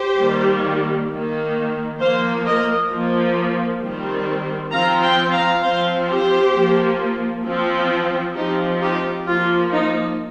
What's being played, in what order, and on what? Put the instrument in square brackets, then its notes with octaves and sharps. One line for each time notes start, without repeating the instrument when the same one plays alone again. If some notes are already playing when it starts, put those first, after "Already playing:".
Already playing: [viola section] G4 C5
D#3 G3 A#3
D#3 A#3
F3 A#3 C5 F5
A#4 D#5
F3 A#3
D#3 G3 C4
F3 C4 F5 A#5
G5 C6
F5 A#5
F3 C4 C5 F5
G4 C5
F3 A#3
F3 C4
F3 C4 D#4 G4
D#4 G4
F3 A#3 F4
D#4